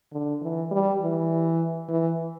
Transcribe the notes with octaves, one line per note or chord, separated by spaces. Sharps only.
D3
E3
G3
E3
E3